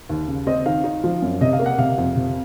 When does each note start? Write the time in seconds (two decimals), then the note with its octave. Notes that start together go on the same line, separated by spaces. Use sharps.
0.09 D#2
0.28 C#3
0.47 C4 D#5
0.66 D#3 F5
0.84 D#4
1.04 F3
1.22 F#2
1.41 C3 D#5
1.53 F5
1.59 A#3
1.66 F#5
1.78 C3 F5
1.98 F2
2.16 C3